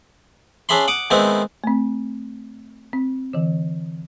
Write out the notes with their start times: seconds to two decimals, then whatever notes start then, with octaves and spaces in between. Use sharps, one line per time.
0.69 C#4 D4 G#4 E5 B5 C6
0.88 F#5 D6 D#6
1.10 D#3 G#3 B3 C4 D#4 E4
1.64 A3 C4
2.93 C4
3.33 D3 E3